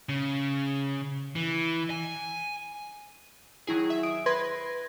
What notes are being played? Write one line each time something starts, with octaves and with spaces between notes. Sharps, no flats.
C#3
E3
G#5
D#3 F#3 E4 G#4
E5
D#6 D7
B4 B5 C6 G#6 A#6